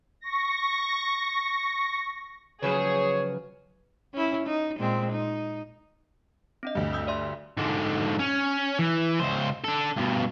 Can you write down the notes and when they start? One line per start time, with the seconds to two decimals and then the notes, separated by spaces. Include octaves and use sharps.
0.21 C#6 A#6
2.63 C#3 F3 F#3 G#4 B4 C#5
4.14 C#4 E4
4.47 D#4
4.78 A#2 G#3 C4
5.12 D#4
6.63 C4 D4 D#5
6.75 D2 G2
6.93 D#6 E6 G6
7.07 D5 E5 C6
7.58 G#2 D3
8.19 C#4
8.79 E3
9.20 C#2 C5
9.64 D4 A4
9.96 G2 B2